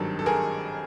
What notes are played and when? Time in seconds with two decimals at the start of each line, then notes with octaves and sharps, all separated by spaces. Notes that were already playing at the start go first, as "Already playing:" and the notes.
Already playing: G#1 G2 D#3 F#3 A4
0.19 A4
0.26 G#4 A#4